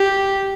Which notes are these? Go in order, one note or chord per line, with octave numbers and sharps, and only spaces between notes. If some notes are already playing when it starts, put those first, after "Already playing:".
Already playing: G4